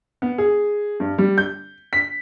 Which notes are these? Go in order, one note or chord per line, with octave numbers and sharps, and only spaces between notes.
B3
G#4
G2
G3
G6
B6